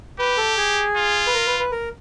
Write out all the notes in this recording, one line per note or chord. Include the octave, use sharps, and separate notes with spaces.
G4 B4
A4
G#4
F4
B4
A#4
B4
B4
A#4